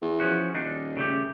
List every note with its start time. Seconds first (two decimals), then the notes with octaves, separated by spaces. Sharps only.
0.02 E2
0.20 F3 C#4 F#4
0.54 D#1 D#3 D4 D#4
0.97 C#3 A3 G4